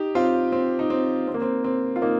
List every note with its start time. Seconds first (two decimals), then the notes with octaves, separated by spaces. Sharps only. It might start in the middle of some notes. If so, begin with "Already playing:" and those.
Already playing: D#4 G4
0.15 C4 F4
0.52 C4
0.79 D#4
0.90 C4
1.28 C4
1.34 A#3
1.42 C4
1.64 C4
1.96 F4
2.02 A#3 D#4